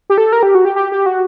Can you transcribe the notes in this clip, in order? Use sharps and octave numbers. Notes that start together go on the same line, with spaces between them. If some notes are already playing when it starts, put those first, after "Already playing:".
G4
A4
A#4
G4
F#4
G4
G4
G4
F#4